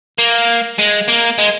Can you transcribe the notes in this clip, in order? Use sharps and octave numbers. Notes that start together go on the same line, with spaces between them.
A#3
G#3
A#3
G#3